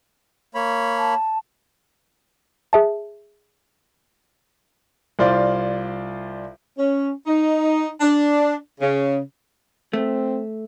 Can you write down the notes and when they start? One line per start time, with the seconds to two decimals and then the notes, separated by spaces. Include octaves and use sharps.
0.55 A#3 C#5 B5
0.98 A5
2.73 G#4 E5 A5
5.19 C2 F4 C5 D5
6.78 C#4
7.27 D#4
8.01 D4
8.81 C#3
9.93 A3 C4